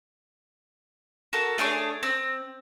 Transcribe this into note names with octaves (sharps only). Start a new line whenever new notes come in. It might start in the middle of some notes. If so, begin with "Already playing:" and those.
F#4 A4 A#4
A3 D4 G#4 C#5
C4